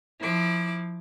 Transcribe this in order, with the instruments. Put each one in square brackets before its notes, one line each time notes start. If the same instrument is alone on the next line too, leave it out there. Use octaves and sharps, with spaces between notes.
[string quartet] F3 E4 D6